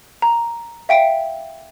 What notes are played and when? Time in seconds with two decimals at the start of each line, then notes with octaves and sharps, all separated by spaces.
0.22 A#5
0.89 E5 F5 G5 B6 D7